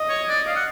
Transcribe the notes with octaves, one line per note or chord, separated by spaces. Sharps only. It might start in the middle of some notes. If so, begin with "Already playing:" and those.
Already playing: D#5
C#5
D5
F5
F#5